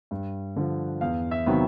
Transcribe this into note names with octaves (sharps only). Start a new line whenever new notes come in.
G2
D3 F3
E2 F5
E5
C3 D#3 F#3 B3